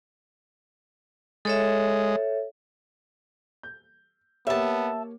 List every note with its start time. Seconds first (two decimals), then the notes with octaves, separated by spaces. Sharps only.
1.45 G#3 A4 C#5 E5
3.63 G6
4.47 A#3 B3 G4 C#5 E5 A5